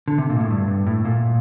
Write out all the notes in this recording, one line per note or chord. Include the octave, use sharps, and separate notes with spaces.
D3
C3
A#2
A2
G2
G2
A2
A#2